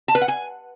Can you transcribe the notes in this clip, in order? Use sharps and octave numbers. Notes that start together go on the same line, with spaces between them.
A5
B4
F#5
G#5